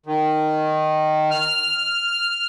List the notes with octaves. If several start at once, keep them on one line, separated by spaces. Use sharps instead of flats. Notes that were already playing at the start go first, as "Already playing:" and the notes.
D#3
F6